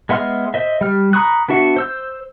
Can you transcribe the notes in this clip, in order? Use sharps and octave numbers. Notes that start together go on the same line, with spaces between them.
G#3 B3 E5 C6 F6
C5 D#5 E5
G3 F6
A#5 B5 C#6 D#6 F#6
B3 D4 F#4 E5 F#5
C5 E6 G6